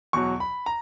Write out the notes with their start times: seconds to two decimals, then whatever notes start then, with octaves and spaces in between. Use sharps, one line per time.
0.13 E2 B2 F#3 C#6
0.40 B5
0.66 A#5